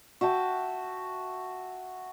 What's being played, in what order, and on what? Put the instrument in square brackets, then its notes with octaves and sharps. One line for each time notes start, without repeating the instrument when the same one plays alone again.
[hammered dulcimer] F#4 E5 G5 A5